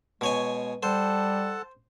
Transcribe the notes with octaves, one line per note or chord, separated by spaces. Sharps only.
B2 G#3 C#5 G#5
G3 A4 C5 F#5 A5